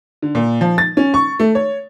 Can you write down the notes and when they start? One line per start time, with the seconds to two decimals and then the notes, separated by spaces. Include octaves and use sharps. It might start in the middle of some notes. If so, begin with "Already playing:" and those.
0.22 D3
0.35 A#2
0.61 F3
0.78 A6
0.97 C#4
1.14 C#6
1.40 A3
1.55 C#5